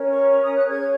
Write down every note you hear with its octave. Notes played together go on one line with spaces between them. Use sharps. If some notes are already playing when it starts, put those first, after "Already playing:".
Already playing: C#4 A#4 C#5
C#6
A#5
D#6
F#6
C#4 G#4 C#5 G#6